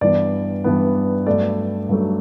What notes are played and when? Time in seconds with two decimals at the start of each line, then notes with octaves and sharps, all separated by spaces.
0.01 G2 E3 B3 D5
0.64 G2 E3 B3
1.27 G2 F#3 A3 D5
1.89 G2 F#3 A3